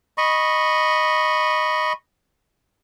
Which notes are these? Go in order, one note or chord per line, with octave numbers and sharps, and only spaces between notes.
D#5 B5 C#6